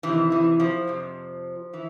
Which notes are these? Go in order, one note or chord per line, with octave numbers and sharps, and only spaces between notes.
F2 C3 D#3 E3
E3
F3
F2 C3
E3